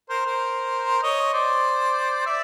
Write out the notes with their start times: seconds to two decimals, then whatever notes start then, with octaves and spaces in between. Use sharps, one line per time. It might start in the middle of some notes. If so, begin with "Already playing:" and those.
0.09 A#4 C5
0.26 A#4 C5
1.03 C#5 D#5
1.33 C5 D5
2.26 D5 E5